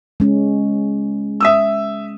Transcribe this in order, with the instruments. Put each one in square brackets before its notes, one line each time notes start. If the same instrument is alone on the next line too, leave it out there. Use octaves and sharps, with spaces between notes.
[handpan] G#3 C#4
[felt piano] E5 D#6 E6